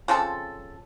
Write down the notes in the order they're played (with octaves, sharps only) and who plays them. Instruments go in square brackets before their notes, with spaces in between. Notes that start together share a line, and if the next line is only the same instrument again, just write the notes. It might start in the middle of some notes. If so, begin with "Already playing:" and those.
[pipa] C#3 F3 C4 A4